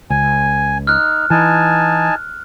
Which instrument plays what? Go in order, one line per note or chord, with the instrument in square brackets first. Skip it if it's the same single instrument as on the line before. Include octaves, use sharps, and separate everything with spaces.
[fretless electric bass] C#2 [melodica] G#5
[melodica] D#4 [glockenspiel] F6 F#6
[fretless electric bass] E3 [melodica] D#4 G#5 A5